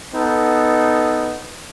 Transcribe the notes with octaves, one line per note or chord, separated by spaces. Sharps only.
B3 D#4 A4